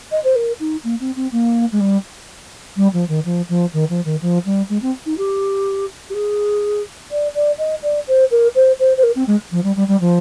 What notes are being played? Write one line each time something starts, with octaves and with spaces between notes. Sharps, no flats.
D#5
C5
A#4
D#4
A#3
C4
C4
A#3
G#3
G3
G3
F3
D#3
F3
F3
D#3
F3
D#3
F3
G3
G#3
C4
D#4
G4
G4
G#4
D5
D5
D#5
D5
C5
A#4
C5
C5
C5
A#4
C4
G#3
F3
G3
G3
G3
F3